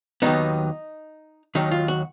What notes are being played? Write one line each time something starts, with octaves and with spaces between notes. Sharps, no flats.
D#2 D#3 F#3 B3 D#4
D#2 D#3 F#3 D#4
F4
F#4